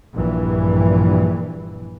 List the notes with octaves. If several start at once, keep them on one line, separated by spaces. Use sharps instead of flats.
A#1 G2 E3